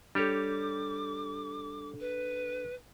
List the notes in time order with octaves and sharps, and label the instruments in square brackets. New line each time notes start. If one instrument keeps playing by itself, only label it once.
[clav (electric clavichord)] G3 G4 C#5 [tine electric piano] D4 A4 [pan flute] D6
[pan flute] B4